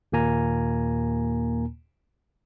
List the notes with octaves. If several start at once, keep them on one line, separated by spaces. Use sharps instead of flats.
D#2 A#2 A#3 G#5 A#5